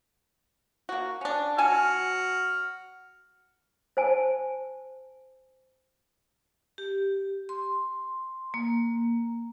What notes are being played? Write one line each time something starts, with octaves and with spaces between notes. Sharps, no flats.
A#3 F#4
C#4 D4
F#3 F#4 G#5 A5 F6
C5 G#5 A5
G4
C6
A#3